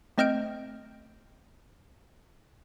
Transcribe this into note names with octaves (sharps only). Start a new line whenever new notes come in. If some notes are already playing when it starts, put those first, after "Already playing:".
A3 C4 D#5 F6 G6 D7